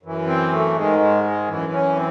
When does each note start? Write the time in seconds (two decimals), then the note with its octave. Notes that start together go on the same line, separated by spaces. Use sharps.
0.03 F#2 E3
0.26 C4
0.52 A3
0.76 G#2 D#3 G#3
0.99 G#3
1.23 G#3
1.47 F#2 E3
1.72 C#4
1.96 C4